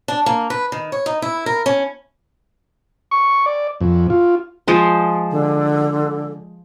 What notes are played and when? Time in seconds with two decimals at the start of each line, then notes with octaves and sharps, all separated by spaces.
0.08 D4
0.26 A#3
0.50 B4
0.72 D#3
0.92 C#5
1.06 D#4
1.22 E4
1.46 A#4
1.66 C#4
3.11 C#6
3.46 D5
3.81 F2
4.10 F4
4.68 F3 G#3 C5
5.31 D3